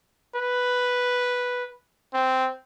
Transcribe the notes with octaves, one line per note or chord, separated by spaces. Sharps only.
B4
C4